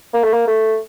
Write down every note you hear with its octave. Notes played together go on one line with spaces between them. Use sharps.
A#3
A3
A#3
A3